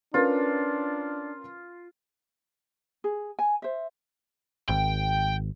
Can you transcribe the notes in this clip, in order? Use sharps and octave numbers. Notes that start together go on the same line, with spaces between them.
C#4 D4 F4 A#4 B4
G#4
G#5
C5 E5
G#1 G5